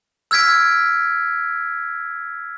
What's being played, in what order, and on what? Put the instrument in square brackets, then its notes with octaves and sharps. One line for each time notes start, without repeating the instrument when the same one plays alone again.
[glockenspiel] E6 F6 G#6 B6 D7